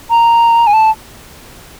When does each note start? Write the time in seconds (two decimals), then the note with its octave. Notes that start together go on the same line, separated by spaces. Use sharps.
0.11 A#5
0.67 G#5
0.73 A5